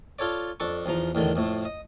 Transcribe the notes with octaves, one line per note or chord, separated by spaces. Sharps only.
F4 A4 C#5 D5
F2 D4 A4 C#6
B1 E2 F3 A#5
E2 A2 D3 D#3
F2 A2 A3
D#5